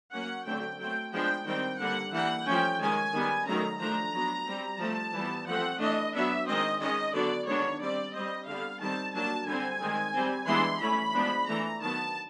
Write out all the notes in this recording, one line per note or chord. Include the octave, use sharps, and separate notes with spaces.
F#3 A#3 C#4 F#5
D3 F#3 A3 C4 G5
F#3 A3 C4 G5
F3 G#3 B3 D4 G5
D#3 G3 C4 G5
D3 G3 A#3 D4 F#5
E3 G3 A#3 F#5
F3 A3 C#4 G5
D#3 G#3 C#4 G#5
D#3 G3 B3
D#3 F#3 A3 C#4 A#5
F3 A3 D4 A#5
F#3 B3 D4
G3 C4
F3 A3 C4 A5
E3 G3 B3
F3 A3 C4 F#5
E3 A3 D4 D#5
F#3 B3 D4 E5
D#3 G#3 C4 D#5
D#3 G#3 C#4 D#5
D3 F#3 B3 D4 D5
D#3 G#3 B3 D4 C#5
G3 C4 D5
G3 C4 D#5
D3 G3 B3 F5
D#3 G3 C4 A5
F#3 A#3 D4 A5
D3 G3 C4 G#5
D#3 G#3 C4
G3 C4
E3 G#3 B3 D4 C6
E3 A3 C#4 B5
F3 G#3 B3 D4
E3 A3 D4 A#5
D#3 F#3 B3 A5